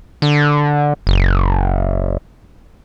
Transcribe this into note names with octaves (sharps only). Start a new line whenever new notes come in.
D3
F#1